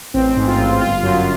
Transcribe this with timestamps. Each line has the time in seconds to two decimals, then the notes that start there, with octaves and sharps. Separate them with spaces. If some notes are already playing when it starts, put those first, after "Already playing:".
0.14 A1 C4
0.36 G#2
0.47 F4
0.58 A1
0.81 G1 F4
1.03 F#2